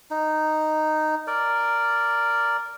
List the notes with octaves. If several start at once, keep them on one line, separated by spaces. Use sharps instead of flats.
D#4
A#4 D5